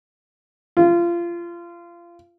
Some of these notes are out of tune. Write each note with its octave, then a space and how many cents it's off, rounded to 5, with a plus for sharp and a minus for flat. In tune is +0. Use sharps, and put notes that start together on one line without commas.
F4 -25